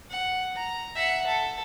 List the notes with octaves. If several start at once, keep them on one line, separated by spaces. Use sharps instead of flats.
F#5
A#5
E5 F#5
A4